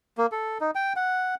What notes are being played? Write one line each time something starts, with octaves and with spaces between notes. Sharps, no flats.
A#3
A4
D#4
G5
F#5